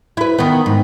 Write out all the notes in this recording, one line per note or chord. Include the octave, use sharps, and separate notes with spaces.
E4 B4
D#3 B3
G#2